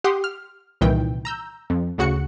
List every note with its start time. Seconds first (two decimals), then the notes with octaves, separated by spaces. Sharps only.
0.04 G4 F#5 C6 D#6
0.24 F6
0.81 C2 A#2 D#3 E3 G5
1.25 A#5 E6 G6
1.70 F2
1.98 D2 C#3 F#4 F#6 C#7